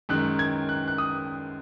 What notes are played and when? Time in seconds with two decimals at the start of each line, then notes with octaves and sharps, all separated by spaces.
0.09 F#2 D#3 G#3 F#6
0.39 G#6
0.69 F#6
0.88 F#6
0.98 D#6